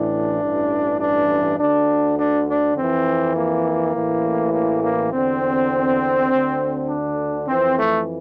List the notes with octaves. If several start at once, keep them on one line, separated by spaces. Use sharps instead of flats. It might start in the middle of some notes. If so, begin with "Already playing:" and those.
Already playing: A1 A2 E3 D4
A1 G2 E3
D4
D2 D3 D4
D4
D4
F2 E3 C4
A#3
A1 A2 E3
A#3
A#3
E2 D3 C4
D2 D3
D4
F2 E3 C4
A3